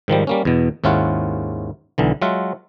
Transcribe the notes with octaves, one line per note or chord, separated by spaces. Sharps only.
G#2 D#3 F3 G3
G3 A#3 C#4
E2 B2
D#2 G#2 C#4 E4 F4 F#5
B1 D3 E3
F#3 G#3 F4 E5 F#5